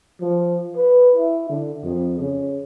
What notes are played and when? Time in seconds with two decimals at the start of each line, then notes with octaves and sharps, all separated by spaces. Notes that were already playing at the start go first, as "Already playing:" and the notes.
0.21 F3
0.76 B4
1.15 E4
1.50 D3
1.84 F2
2.19 C#3